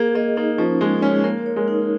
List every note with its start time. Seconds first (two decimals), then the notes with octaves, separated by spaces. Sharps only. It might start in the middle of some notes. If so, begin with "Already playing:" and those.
Already playing: A#3 G#4
0.15 A#3 D#5
0.37 A#3 D#4
0.58 F3 C#4
0.81 G#3 G#4
1.02 G#3 C#4
1.24 A#3 A#4
1.46 C#5
1.56 G#3
1.68 D#4